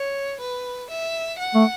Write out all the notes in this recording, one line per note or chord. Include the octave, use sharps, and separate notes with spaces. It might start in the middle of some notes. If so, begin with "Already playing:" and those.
Already playing: C#5
B4
E5
F#5
A3